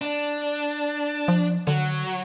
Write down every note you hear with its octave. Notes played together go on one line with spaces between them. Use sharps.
D4
F3
D3 F#3